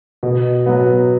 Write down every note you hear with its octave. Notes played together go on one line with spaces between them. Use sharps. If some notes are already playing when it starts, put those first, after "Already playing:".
B2
F#3 B3